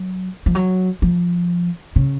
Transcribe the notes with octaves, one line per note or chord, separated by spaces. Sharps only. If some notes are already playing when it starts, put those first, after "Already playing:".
Already playing: F#3
F3
F#3
F3
C#3